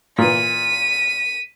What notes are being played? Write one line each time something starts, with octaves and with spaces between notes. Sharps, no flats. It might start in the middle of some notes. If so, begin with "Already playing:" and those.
A#2 E3 B6 D#7